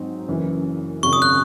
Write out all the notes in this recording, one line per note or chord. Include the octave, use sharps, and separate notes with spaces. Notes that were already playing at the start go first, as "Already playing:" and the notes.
Already playing: G#2 F#3 C4 D#4
F#1 F#2 E3
G#1 F#2 C#3 F#3 C#6
D#6
F#6